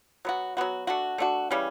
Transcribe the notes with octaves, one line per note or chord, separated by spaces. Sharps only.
F#3 B3 F#4
F#3 B3 F#4
A3 D4 F#4
A3 D4 F#4
C#3 E3 G3 C#4